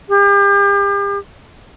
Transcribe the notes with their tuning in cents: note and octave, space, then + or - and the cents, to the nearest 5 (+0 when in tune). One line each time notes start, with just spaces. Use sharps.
G4 +40